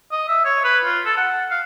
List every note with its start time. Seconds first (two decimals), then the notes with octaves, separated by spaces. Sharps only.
0.12 D#5
0.28 E5
0.45 C#5
0.64 B4
0.85 F4
1.06 A4
1.17 F#5
1.51 F5